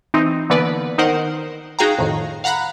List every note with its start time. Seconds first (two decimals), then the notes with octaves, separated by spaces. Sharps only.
0.14 E3 C4 D#4
0.50 D3 E3 A#3 B3 B4 D5
0.98 D#3 D#4 A#4 C5 F#5
1.79 D#4 F#4 G#4 F5 G5 A#5
1.98 F2 A2 D#3
2.44 F5 F#5 A#5 B5 F#6